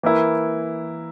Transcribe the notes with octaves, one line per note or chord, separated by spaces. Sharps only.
E3 A#3 E4